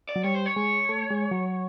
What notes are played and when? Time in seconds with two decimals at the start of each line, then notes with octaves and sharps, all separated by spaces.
0.09 D5
0.16 F#3
0.24 G3 C#5
0.34 C5
0.46 C#5
0.56 G#3
0.89 A3
1.10 G#3
1.31 F#3